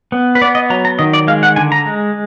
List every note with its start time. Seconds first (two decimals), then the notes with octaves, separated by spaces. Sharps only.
0.12 B3
0.35 B4
0.41 B3 D5
0.55 D#5
0.70 F#3 A#5
0.85 A#5
0.99 D#3 D#5
1.13 D5
1.28 G#3 F5
1.43 F#5
1.56 D3 G#5
1.72 A#5
1.86 G#3